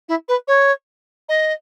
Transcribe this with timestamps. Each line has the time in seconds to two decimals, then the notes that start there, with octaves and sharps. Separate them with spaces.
0.08 E4
0.28 B4
0.47 C#5
1.29 D#5